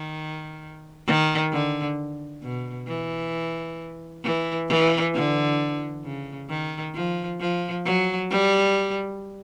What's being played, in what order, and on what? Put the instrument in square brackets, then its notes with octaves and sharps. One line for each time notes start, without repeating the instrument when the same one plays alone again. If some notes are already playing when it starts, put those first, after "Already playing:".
Already playing: [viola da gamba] D#3
D#3
D3
B2
E3
E3
E3
D3
C#3
D#3
F3
F3
F#3
G3